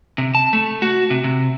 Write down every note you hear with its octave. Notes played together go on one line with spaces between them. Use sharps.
C3
A5
A3
F#4
C3
C3